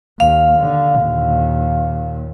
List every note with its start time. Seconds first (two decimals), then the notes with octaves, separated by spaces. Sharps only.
0.20 D#2 F5
0.59 D3
1.01 D#2 A#2